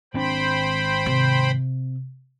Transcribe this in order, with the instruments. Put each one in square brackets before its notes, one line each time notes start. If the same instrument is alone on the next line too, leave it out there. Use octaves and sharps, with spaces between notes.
[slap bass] G#1 C4 D4 [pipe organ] C5 G5 B5
[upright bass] C3